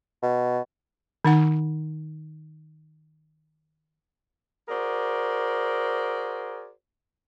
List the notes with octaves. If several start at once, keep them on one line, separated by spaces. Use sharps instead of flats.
B2
D#3 D#4 F#5
F#4 G#4 A#4 C5 D5